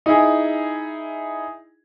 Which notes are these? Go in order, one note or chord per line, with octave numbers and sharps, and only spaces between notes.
D#4 E4 G#4